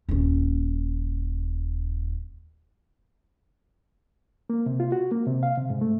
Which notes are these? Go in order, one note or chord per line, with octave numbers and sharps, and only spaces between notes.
D#1 C#4
A#3
C3
F4
F#4
A#3
C3
F5
C3
G#2
A3